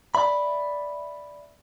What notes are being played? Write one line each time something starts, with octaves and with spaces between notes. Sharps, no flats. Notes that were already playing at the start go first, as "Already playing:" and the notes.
D5 E5 B5